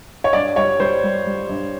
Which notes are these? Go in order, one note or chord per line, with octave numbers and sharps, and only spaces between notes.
C#5
G2 D5
G3 C#5
G3 C5
G3
G3
G2